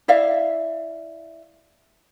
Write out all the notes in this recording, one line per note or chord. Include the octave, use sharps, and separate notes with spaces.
E4 D5 E5 F5